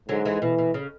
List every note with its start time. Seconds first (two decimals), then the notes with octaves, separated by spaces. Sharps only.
0.09 G#2 D3 F#3
0.25 E3 G#3
0.42 B2 E3
0.58 B2
0.74 C#3